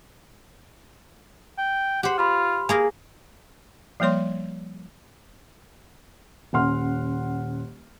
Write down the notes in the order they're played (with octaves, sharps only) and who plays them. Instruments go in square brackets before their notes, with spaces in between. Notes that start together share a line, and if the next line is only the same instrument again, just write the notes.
[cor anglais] G5
[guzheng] G4 C5 [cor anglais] F#5
[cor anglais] F4 [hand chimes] B5 C6 F6
[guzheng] A#3 G#4 A#4 [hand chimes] G#5
[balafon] F3 G3 A#3 C#5 C6
[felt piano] D#1 C#4 F#5 C6 F6